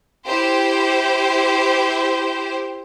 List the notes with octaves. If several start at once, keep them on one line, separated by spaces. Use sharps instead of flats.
E4 G4 C5